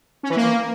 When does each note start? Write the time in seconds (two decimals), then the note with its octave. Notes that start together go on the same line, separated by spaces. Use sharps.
0.23 C#4
0.30 E3
0.36 A#3